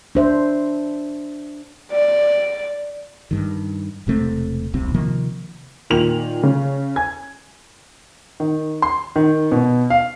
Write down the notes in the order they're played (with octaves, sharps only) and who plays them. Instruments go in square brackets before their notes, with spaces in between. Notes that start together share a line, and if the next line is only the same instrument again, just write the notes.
[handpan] D4 C5 E5
[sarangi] D5
[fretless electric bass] G2 D#3
E1 C3 A3 C4
D#1 C2 C3 C4
C3 D#3 F3 A#3
[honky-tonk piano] A#2 D#3 F7 F#7
C#3
G#5 G#6
[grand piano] D#3
C6
D#3
B2
F5